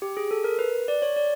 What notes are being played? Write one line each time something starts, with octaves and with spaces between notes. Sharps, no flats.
G4
G#4
A4
A#4
B4
D5
C#5
D5